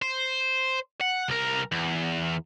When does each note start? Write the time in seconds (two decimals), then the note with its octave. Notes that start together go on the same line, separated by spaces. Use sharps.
0.02 C5
1.01 F#5
1.29 C2 A#4
1.72 E2